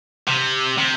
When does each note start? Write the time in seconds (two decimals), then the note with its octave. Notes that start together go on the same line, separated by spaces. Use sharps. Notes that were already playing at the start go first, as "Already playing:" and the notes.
0.28 C3
0.78 C3